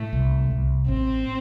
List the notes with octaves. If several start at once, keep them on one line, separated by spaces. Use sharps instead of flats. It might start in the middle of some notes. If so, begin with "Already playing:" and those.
Already playing: A2 A3
C2
C2
A1 C4